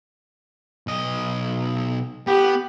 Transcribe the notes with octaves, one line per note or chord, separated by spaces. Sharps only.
B1 D#5
B3 G4